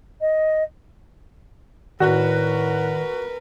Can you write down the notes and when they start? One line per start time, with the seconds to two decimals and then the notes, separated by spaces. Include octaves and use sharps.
0.21 D#5
2.00 A2 D#3 F#4 A#4 B4 D5 F#6